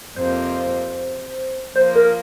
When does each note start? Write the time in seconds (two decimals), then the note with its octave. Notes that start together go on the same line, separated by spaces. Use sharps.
0.16 F2 C3 A#3 F4 C5
1.76 F3 A#3 F4 C5
1.96 A#4